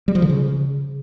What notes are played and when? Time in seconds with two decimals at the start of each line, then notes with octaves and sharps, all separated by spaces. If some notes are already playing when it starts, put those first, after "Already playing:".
0.08 G3
0.15 F3
0.22 D3
0.29 C#3